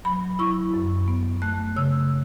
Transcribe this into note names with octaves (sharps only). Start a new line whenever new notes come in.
F#3 B5
E4 C#6
F#2
B3
A3 F#6
C#3 E6